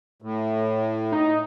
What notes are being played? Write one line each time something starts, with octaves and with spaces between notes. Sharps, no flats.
A2
D#4